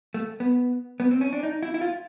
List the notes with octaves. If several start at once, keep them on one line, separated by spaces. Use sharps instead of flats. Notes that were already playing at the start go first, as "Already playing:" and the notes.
A3
B3
B3
C4
C#4
D4
D#4
E4
E4
F4